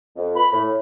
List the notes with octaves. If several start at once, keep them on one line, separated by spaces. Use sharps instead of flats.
F2
B5
A2